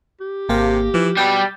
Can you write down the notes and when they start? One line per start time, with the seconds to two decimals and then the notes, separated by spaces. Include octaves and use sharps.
0.20 G4
0.49 G#1 C3 A#3 F5
0.94 E3 F3
1.17 B2 G3 G6 A6